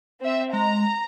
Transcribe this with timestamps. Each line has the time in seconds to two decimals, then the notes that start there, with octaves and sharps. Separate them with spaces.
0.22 C4 E5
0.53 G#3 A#5